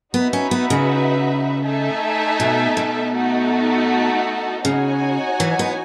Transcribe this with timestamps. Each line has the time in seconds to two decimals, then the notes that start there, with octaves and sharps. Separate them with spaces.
0.14 B3 D#4 F#4 B4 E5
0.33 C#4
0.51 B3
0.70 C#3
1.64 A3 D#4 A4 E5 G#5
2.40 B2
2.77 B2
3.14 A3 D#4 F#4 A4
4.65 C#3 D#4 F#4 C#5 G#5
5.40 E3
5.59 B3